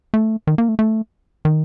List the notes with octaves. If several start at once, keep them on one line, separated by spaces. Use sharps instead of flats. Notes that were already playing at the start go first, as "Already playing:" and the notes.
A3
D#3
A#3
A3
A3
D#3